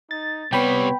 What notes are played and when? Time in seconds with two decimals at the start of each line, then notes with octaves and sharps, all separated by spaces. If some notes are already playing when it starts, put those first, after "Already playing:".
0.11 D#4 A6
0.53 C3 G3 B3 C#5 G5 B5